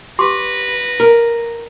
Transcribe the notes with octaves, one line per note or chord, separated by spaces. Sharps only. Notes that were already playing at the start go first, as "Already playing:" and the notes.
G4 B4 C6 D6 A#6
A#4